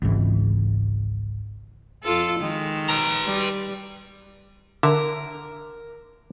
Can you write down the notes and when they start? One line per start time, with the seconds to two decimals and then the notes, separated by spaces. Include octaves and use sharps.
0.02 G#1 C#2 G#2 E3
2.03 F2 F4 A4
2.39 D#3 G#3
2.89 B4 A#5
3.26 G3
4.83 D3 A#4 E5